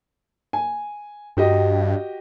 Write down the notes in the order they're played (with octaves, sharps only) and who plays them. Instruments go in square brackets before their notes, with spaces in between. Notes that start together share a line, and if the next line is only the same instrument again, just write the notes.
[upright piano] G#5
[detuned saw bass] G2 [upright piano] F#4 G4 D#5